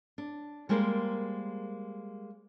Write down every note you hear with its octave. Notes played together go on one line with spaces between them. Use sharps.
D4
G3 G#3 A#3 A#4 C5